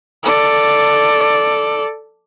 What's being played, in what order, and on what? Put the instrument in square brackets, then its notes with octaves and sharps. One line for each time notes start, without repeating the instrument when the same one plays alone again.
[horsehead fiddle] A4 D5